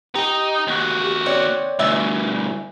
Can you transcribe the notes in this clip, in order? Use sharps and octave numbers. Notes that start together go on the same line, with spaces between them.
D#4 G4
D#2 F#4
C4 C#5 D5
D2 G2 E3 E5